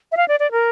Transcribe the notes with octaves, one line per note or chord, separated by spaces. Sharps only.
E5
F5
D5
D5
A#4